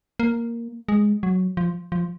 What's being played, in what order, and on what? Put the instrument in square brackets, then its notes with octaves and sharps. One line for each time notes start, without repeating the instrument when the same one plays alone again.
[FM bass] A#3
G#3
F#3
F3
F3